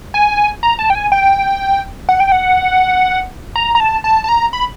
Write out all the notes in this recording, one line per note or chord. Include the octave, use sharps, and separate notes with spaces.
G#5
A#5
A5
G5
G#5
G5
F#5
G5
F#5
A#5
A#5
A5
A5
A5
A#5
B5